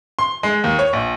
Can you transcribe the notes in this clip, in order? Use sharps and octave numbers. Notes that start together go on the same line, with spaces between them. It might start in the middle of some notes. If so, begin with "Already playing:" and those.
C6
G#3
D#2
C#5
A#1